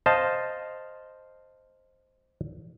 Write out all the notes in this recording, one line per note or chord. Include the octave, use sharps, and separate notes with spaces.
C5 D#5 F5 A5